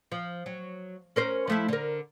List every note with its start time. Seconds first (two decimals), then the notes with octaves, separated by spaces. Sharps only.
0.12 F3
0.46 F#3
1.16 C#4 A#4 C5
1.47 F3 A3 E4
1.68 D3 A#4